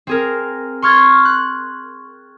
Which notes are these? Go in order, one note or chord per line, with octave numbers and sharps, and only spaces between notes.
C4 G#4 A#4
C6 C#6 F6 G#6 A6
F#6